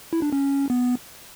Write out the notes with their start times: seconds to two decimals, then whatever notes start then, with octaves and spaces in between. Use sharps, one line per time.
0.13 E4
0.22 D4
0.33 C#4
0.70 B3